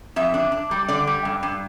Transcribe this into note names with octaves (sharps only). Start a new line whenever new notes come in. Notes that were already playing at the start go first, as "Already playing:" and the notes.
F2 E5
D4
D4
G3
D3 D5
G3
G2
G2